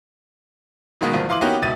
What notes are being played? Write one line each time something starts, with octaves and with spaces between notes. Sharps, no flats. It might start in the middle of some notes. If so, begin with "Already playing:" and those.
B2 D#3 G#3 A#3 B3
G1 F3 A#3
E3 F5 C6 D6 F#7
A#3 B3 C#4 D#4 F#4 G4
C#2 B2 E5 A6 D#7